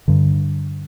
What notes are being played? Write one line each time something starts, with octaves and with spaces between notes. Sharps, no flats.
G2 D3